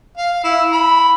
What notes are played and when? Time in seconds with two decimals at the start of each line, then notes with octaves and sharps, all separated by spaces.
0.17 F5
0.44 E4
0.72 B5